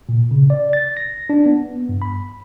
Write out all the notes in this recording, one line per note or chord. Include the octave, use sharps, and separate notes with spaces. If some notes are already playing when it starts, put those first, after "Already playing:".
A#2
C#3
D5
A6
A#6
D4
B3
G2
B5